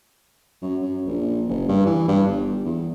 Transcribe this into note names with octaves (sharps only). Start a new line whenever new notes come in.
F#2
F#2
A#1
F#1
G2
E3
G2
G1
E2